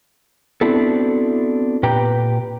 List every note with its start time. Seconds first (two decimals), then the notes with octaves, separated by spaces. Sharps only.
0.61 B3 C4 D4 E4 F#4 A4
1.83 A#2 G4 B4 G5 A#5